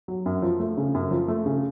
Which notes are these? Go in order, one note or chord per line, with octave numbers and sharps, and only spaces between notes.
F#3
F#2
F3
A3
C#3
F#2
F3
A3
C#3